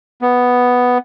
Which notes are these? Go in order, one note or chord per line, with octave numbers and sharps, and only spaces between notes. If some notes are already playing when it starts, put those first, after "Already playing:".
B3